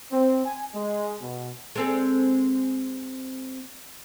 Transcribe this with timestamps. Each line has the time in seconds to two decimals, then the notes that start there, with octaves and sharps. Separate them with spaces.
0.12 C4
0.46 G#5
0.75 G#3
1.21 B2
1.76 G#3 C4 A4